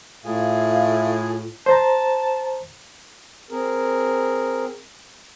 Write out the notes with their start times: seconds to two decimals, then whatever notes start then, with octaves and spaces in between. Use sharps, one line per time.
0.25 A2 F4 G#4 E5 F5
1.66 C5 A5 A#5
3.50 C4 G#4 A#4